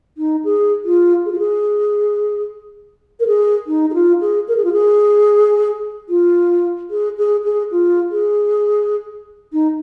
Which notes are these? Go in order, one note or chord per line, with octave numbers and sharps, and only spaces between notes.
D#4
G#4
F4
G#4
F4
G#4
A#4
G#4
D#4
G#4
F4
G#4
A#4
G#4
F4
G#4
F4
G#4
G#4
G#4
F4
G#4
D#4